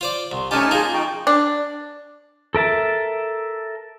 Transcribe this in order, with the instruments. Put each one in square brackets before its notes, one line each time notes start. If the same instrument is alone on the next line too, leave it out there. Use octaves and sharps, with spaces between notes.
[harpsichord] F4 C5 D5
[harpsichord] C2 [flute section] C6
[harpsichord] A3 G4 [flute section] C#4 F#5 F6 [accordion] D#4 G#5 A5
[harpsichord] A#3 A#4 [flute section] F4 G#4 F#5
[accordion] F3 D#4 [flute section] G5 C#6
[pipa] D4
[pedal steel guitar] A4 A#4 E5 A5